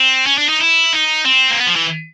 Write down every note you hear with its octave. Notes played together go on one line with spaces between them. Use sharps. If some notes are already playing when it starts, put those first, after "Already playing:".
Already playing: C4
C#4
D4
D#4
E4
D#4
C4
A#3
B3
F3
E3